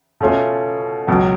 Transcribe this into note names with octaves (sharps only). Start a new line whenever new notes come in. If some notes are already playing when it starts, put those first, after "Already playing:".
B2 A3 C#4 F4
C#2 B2 F#3